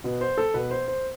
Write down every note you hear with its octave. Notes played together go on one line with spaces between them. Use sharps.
B2 B3
C5
A4
B2 B3 B4
C5
C5